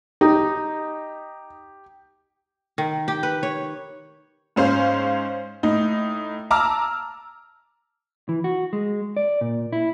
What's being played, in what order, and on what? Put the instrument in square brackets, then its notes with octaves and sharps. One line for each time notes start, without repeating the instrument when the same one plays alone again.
[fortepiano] D#4 [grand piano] G4
[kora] D#3
G4
B4
C#5
[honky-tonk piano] G#2 C#4 C5 F5
A2 D#4
A5 A#5 D6 E6 F6
[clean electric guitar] E3
F#4
G#3
D5
A#2
E4